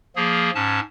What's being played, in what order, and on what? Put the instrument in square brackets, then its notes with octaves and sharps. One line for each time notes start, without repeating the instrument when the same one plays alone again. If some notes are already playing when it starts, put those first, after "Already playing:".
[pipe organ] F3 A#3 G#4
G#2 C#4 A5